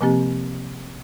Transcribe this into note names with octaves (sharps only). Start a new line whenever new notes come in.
C3 F3 A#3 C4 G4 A6